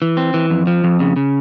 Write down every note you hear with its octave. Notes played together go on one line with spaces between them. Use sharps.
E3
C4
E3
F2
F3
F2
C#3
C#3